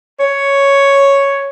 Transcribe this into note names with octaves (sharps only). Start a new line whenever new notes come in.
C#5